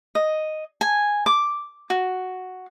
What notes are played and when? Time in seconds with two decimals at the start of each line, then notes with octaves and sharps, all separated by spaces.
0.15 D#5
0.81 G#5
1.26 D6
1.90 F#4